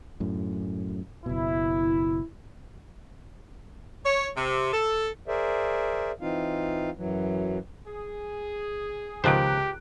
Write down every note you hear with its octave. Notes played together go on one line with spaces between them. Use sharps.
F#2 A2
F#1 B2 E4
C#5
C3
A4
G#4 A#4 C5 D5 E5
E3 C4 D#4 F4 F5
F#2 E3 F#3
G#4
C#2 D#3 F3 G4 C5 F#6 D7